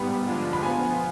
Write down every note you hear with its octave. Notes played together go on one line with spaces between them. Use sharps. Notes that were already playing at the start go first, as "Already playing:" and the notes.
Already playing: G#2 G3 B3 G5 B5
D3 F3 G#3 D4 F4
B5
F3 B3 F4 G#5